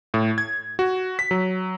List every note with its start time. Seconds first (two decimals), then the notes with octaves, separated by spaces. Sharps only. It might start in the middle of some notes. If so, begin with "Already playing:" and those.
0.14 A2
0.38 G#6
0.79 F#4
1.19 B6
1.31 F#3